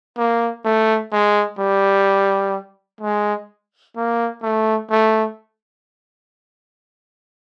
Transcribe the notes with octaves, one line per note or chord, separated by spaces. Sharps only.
A#3
A3
G#3
G3
G#3
A#3
A3
A3